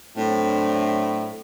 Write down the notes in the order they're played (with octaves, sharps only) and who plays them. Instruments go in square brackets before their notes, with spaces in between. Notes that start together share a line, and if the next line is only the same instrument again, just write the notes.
[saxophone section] A2 [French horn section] F#3 C4 D4